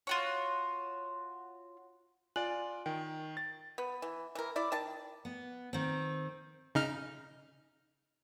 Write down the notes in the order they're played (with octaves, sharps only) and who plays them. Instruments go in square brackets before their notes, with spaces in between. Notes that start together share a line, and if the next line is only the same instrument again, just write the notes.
[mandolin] F4 F#4 C#5
[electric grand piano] F4 D5 [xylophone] G#5 F#6 F#7
[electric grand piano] D#3 [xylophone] G5
[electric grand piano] A6
[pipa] B3
E3
E3 A#4
E4 D5
D#3 A5
[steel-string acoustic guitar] B3
D#3 C4
[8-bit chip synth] C#3 D#4 F6